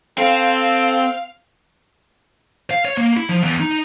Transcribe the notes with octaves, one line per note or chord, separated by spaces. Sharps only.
C4 A4 F5
F5
C#5
A#3
E4
F3
E2
D#4